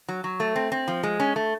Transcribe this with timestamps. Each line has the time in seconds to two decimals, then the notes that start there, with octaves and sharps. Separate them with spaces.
0.08 F#3
0.24 F#3
0.40 A3
0.56 C4
0.72 C4
0.88 F3
1.03 G#3
1.20 C#4
1.36 A3